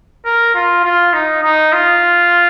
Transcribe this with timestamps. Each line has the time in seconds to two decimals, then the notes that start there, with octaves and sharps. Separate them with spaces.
0.25 A#4
0.54 F4
0.84 F4
1.14 D#4
1.43 D#4
1.73 F4